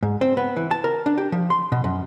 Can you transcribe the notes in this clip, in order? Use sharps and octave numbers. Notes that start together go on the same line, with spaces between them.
G#2
C4
B3
E3
A5
A#4
D4
G4
F3
C6
B2
F#2